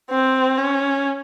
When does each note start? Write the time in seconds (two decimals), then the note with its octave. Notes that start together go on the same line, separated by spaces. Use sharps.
0.10 C4
0.57 C#4